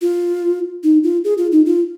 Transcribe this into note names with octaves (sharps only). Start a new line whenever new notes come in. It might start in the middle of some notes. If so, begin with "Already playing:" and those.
F4
D#4
F4
G#4
F4
D#4
F4